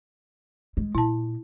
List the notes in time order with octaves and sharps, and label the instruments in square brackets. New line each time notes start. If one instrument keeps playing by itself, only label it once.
[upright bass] G#3
[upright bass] A#2 [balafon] E4 A5